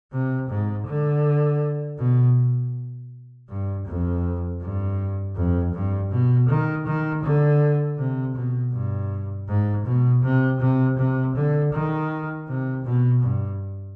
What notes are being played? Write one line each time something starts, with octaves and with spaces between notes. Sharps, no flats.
C3
G#2
D3
B2
G2
F2
G2
F2
G2
B2
D#3
D#3
D3
C3
B2
G2
G#2
B2
C3
C3
C3
D3
D#3
C3
B2
G2